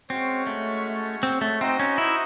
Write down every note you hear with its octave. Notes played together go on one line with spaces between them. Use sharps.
G#3 C4 C#4 F#4 C#5
A3
C4
A3
C4 D#4 F#4 C5 D#5
C#4
E4